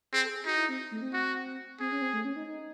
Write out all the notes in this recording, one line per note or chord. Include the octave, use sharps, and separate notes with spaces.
C4 G#4
A4
G#4
D#4 F#4
E4
C4
A3
C4
F#4
C4 G#4
C#4
C4
A3
C#4
D#4
D#4